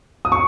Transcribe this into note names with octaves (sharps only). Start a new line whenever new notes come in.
D#6
C#6